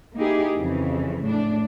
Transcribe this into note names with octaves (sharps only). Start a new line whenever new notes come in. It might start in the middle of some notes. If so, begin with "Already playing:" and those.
A#3 D#4 E4 G4 G#4
F2 C#3 E3
A2 D4